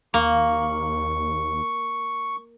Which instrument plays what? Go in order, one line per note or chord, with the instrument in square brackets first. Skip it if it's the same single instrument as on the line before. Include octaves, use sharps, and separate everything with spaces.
[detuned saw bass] D#2 [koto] A#3 [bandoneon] C#6